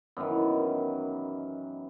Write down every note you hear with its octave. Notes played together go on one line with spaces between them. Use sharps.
F#2 B2 D#3 E3